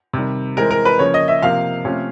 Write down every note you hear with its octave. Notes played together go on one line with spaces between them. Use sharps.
C3 D#3 G3
E3 G#3 C4 A#4
A#4
B4
C#3 F3 A#3 C#5
D#5
E5
C3 F3 A#3 F5
C3 F3 A3 C#4